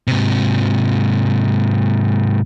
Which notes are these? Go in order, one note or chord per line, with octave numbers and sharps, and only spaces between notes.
G#2 C3